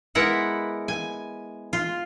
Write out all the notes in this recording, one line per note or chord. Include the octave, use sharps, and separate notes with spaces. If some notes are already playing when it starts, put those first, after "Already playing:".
G#3 B3 E4 A#4 F#5
G#5
F4